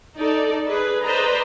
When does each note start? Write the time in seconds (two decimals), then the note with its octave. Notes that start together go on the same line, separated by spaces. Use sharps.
0.17 D#4 A4 D5
0.69 G#4 B4
1.04 B4 C5 D5 D#5 A#5